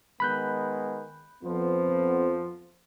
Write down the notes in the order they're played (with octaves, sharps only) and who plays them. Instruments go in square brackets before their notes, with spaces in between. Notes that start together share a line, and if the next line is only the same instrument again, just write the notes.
[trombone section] D#3 G#3 B3 [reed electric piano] B5 F#6 G6
[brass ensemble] F2 B3 [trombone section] F3 C5